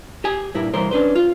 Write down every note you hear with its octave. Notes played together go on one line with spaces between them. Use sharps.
G4 G#5
G2 A#2 E4 A#4
C2 G2 E3 A#4 C5
C#4 D4 B4 C5
F4